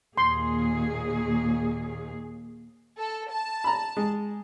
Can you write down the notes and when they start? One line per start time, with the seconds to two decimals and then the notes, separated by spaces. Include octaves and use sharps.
0.18 D#2 A#2 G#4 C6
2.98 A4
3.32 A5
3.64 A#5 B5
3.97 G#3